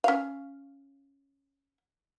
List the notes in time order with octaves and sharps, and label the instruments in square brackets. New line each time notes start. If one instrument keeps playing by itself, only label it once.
[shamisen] C#4 F5